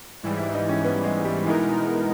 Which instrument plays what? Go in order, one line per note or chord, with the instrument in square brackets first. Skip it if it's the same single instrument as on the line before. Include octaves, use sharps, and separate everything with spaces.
[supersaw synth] G#2 E3 G3
[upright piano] E4
D#4
C#4
B3
G#3
G3
[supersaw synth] B2 G#3 B3 D#4 A#4 [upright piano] E3